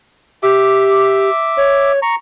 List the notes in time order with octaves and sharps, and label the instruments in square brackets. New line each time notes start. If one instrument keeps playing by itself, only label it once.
[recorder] G4 [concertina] E5 D6
[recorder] C#5
[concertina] A#5 C#6